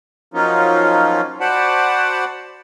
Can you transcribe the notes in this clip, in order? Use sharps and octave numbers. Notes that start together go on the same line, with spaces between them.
F3 F#3 A#3 C#4 D#4 F4
F#4 C5 D5 F#5 A5 B5